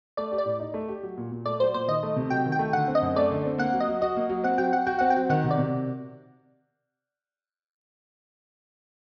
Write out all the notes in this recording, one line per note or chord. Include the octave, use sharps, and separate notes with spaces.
A3 D5
G4
D5
A2
D#4
A3
G4
F#3
A#2
A#2
A3 D5
F#3 C5
A#2 C5
D#3 D#5
A3
C3
F#3 G5
D#3
G5
A3
D3 F#5
C4
D#5
F#2
A3 D5
D3
C4
A#3 F#5
F#3
D#5
F#3
F#4 D#5
A#3
F#3
C4 F#5
F#3 G5
F#3 F#5
F#4 G5
C4 F#5
G5
F#3
D#3 F#5
C3
D5
C3